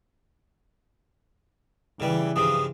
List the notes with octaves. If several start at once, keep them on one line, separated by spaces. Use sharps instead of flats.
C#3 E3 G3
G2 C#3 F3 D#6